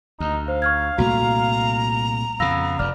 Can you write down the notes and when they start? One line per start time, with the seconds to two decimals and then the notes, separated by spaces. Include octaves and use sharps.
0.20 D2 D#4
0.48 C5 F5
0.62 C#6 F6 G#6
0.98 C2 A#2 A3 F#4 A#5
2.40 F2 C#3 B3 F5 E6 A#6
2.79 F1 F2 D5 F6